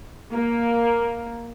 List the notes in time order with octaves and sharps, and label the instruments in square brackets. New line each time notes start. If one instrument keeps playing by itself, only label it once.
[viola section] A#3